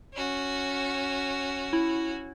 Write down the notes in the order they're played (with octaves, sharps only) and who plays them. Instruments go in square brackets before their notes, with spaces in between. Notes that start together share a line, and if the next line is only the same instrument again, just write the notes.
[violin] C#4 F#4
[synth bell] E4